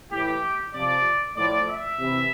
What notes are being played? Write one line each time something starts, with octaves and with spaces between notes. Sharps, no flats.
A2 E3 G4
C3 F3 D5
A2 F3 D5
E5
C3 E3